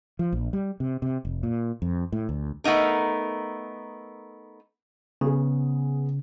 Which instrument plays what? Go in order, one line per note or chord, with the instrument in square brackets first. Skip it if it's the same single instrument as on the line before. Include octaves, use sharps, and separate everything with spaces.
[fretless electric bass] F3
A#1
G3
C3
C3
F1
A#2
F2
A2
D2
[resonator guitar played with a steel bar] A3 B3 D#4 A#4
[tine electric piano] C#3 [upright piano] B3 G#4